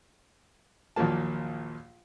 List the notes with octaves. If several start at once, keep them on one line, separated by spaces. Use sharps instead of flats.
A#1 D#2 A#2 F#3 A#3 A5